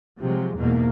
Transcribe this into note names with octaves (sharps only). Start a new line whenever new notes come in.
C3 F3 F#3 G#3
E2 G#2 B2 A#3